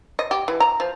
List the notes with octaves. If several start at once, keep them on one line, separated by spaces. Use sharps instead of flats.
D#5
G4
E3
A#5
F3